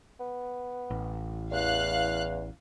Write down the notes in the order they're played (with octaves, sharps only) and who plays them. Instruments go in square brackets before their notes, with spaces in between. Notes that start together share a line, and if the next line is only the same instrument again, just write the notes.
[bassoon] B3
[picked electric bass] A1
[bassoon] E2 [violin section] F5 F#6